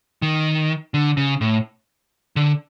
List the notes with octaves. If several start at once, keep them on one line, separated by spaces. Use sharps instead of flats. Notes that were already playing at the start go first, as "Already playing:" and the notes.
D#3
D3
C#3
A2
D3